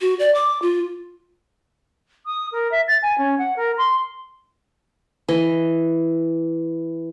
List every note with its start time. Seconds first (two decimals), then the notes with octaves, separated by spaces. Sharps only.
0.01 F#4
0.19 D5
0.35 D6
0.62 F4
2.26 D#6
2.52 A#4
2.71 E5
2.87 A6
3.02 G#5
3.18 C#4
3.38 F#5
3.56 A#4
3.77 C6
5.29 E3 D#5